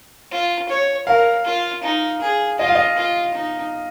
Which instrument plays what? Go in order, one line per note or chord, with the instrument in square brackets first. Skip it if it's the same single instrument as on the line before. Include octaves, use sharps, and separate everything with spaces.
[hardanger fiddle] F4
C#5
[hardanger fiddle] A#4 [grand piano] F5
[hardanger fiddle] F4
D#4
G#4
[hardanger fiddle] F4 [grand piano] D#5
[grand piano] F5
D#5
[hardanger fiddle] F4
D#4